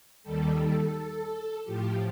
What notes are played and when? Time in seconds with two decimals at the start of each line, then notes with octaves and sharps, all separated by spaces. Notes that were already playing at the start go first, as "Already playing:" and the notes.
0.23 D#2 D#3 G3 A4
0.59 A4
1.64 A2 F3 G4